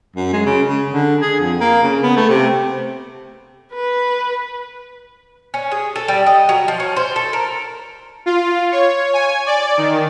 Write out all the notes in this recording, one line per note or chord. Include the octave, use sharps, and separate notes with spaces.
F#2
G#3
C#3
C#3
D3
G#4
F2
A#3
C#3
B3
A3
C3
B4
C#4
G#4
A4
G3
D#5
F#3
F3
C#4
C5
A4
A#4
F4
C#5
G#5
D5
D#3